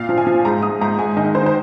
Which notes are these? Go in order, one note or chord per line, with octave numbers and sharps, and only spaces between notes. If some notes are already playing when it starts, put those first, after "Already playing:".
Already playing: A#2 F5
F3
G#5
F3
G#2 A#5
G#2 D#6
G#2 A#5
G#2 G#5
D#3 D#5
D#3 C5
C5